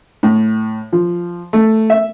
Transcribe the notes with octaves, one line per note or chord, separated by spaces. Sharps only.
A2
F3
A3
E5